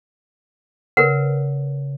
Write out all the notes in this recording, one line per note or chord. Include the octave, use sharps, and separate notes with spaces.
C#3 A#4 B4 F#5